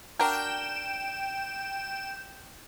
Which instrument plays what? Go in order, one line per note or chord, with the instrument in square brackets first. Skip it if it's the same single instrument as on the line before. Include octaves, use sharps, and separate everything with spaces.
[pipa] D4 F#4 A#4 [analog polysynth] G5 E7